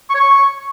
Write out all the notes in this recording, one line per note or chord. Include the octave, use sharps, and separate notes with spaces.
C#6
C#5
C#6